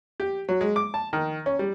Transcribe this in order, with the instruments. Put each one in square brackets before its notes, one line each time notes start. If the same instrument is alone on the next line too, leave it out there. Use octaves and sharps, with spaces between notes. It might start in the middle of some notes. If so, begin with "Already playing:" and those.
[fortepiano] G4
F#3
G#3
D6
A5
D#3
C#4
G3